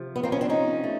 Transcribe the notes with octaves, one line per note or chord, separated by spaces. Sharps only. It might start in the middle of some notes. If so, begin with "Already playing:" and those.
Already playing: C3 F3
B3
A#3 C4
B3 C#4
C4 D4
C#4 D#4
A3